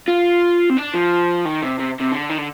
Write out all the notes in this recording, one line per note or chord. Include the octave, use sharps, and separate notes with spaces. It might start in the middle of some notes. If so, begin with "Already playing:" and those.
F4
C4
D4
F3
D#3
C3
C3
C3
D3
D#3
D3